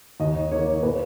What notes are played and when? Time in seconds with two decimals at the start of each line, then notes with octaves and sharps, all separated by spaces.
0.20 D#2 D#5
0.51 D#3 A#3 C#5
0.83 A#2 B4